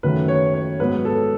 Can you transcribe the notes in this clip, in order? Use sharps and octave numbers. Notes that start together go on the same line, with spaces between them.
F#2 D#3 F#3 A3 B4
C#5
C#5
G#2 F#3 B3 B4
A4